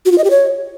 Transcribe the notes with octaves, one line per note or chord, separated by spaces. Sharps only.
F#4
F4
D#5
G4
C#5